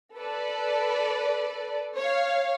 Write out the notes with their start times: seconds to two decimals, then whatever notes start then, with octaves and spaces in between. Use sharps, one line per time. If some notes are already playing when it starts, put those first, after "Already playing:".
0.16 A4 B4 D5
1.97 C#5 F5